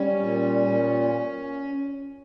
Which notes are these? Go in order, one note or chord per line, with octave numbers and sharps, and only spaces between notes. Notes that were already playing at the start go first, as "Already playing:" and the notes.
Already playing: G3 C#4
A#2
A#2